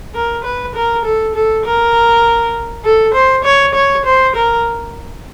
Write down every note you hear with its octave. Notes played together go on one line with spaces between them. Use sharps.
A#4
B4
A#4
A4
A4
A#4
A4
C5
C#5
C#5
C5
A#4